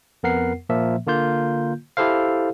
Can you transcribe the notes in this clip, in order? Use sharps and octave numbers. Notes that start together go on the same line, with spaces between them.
F2 B3 A#4 F#5 C7
A#2 F3 A#3 E5
D3 A#3 F4 G6
E4 G4 A4 C5 F5